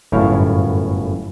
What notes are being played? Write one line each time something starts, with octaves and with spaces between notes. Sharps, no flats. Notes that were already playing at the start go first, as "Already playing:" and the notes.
G1 F#2 A2 E4 C#5 F5